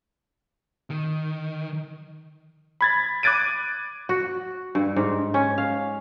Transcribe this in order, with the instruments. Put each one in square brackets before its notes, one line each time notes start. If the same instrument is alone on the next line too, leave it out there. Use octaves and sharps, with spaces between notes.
[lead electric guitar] D#3
[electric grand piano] B5 G#6 A6
D6 F#6 G#6 A6 D7 D#7
[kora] F#4
G2
G#2
C#4
F5